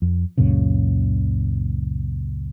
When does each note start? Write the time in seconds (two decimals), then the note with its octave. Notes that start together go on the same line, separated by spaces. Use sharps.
0.02 F2
0.38 C#2 F#2 A#2 C#3